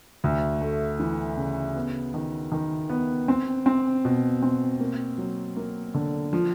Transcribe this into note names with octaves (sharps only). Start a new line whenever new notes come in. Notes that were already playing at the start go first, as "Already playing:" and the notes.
D2
A3
E3
C#3
B3
D#3
D#3
B3
C4
C4
B2
C4
A#3
F#3
A#3
D3
F3